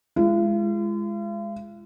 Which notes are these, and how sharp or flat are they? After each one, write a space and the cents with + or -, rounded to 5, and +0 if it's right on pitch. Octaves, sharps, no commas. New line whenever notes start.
G#3 +0 F4 -45